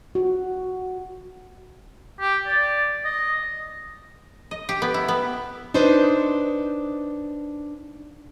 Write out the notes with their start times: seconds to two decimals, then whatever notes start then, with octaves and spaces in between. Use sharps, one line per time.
0.15 F#4
2.20 G4
2.46 D5
3.05 D#5
4.51 D#5
4.69 G4
4.82 B3
4.94 E4
5.08 B3
5.74 D4 D#4 B4 C5